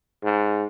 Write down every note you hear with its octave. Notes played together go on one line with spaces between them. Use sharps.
G#2